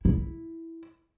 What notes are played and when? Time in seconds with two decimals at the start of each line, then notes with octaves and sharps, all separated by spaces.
0.05 E4